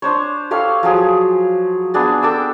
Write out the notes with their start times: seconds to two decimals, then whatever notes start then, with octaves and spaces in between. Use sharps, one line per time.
0.02 D4 C5 C#5
0.51 G4 A4 C#5 F5
0.83 F3 F#3 G#4
1.94 B3 D4 G#4
2.23 G4 A4 D6 E6